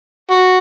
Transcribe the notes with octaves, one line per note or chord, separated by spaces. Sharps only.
F#4